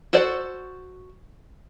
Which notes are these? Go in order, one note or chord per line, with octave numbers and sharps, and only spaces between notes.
F#4 A4 C5 D5